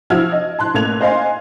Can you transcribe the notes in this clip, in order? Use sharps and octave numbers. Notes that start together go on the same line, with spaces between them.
F3 E4 F#4 E6 F6 G#6
D#5
A5 C6 F#6
A1 A3 A#3 G#6 F7
C5 D#5 F5 G#5 C6